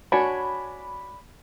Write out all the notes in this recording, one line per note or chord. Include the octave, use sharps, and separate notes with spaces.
D4 F#4 C#5 G#5 B5